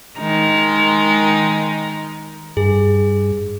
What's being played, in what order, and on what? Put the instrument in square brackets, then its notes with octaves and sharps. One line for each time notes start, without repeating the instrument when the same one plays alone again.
[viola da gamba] D#3 G#3 D#4
[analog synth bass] G2 [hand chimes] G#4